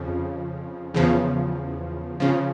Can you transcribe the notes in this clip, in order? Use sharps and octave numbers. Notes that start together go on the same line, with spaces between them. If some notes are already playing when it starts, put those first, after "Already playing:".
Already playing: F2 C#3 F3
E2 C#3 F3
C#3 F3